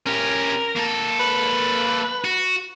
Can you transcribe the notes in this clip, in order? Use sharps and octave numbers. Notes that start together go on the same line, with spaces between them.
C#4 G4 A#4
A#3 A4
B4
F#4